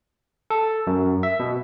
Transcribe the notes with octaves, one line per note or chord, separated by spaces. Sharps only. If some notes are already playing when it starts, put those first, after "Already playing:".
A4
F#2
E5
B2